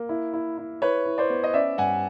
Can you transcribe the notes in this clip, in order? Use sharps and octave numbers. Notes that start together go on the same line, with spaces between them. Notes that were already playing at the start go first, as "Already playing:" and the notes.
Already playing: A#3
E4
E4
E4
E4 B4 C#5
E4
C5 D5
B3
D#5
C#4 D5 E5
G2 F#5 G#5